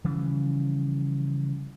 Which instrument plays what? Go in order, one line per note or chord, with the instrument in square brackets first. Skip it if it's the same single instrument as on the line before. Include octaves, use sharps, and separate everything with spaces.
[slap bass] C#3 E3 F3 G3